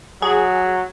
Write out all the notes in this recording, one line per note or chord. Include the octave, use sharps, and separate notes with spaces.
F#3 G#4